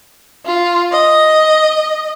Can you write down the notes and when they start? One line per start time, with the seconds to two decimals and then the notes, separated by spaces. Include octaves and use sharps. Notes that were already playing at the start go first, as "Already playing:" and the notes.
0.45 F4
0.92 D#5